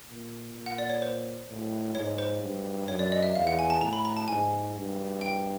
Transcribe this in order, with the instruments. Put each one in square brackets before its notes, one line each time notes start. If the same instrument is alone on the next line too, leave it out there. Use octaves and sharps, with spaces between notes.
[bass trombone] A#2
A#2
[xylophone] F#5
D5
C#5
C5
[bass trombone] A2
[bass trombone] G#2 [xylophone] C#5
[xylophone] C5
[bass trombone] G2
[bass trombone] F#2 [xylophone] C#5
[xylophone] D5
D#5
E5
[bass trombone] E2 [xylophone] F5
[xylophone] F#5
G#5
A5
[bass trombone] A2 [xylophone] A#5
[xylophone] B5
A#5
A5
[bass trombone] G#2 [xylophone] G#5
[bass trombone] G2
[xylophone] G5